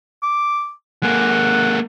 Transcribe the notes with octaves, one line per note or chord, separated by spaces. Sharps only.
D6
G#3 A#3 F#5